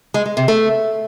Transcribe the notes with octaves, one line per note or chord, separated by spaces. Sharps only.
G#3
G#3
C3
A3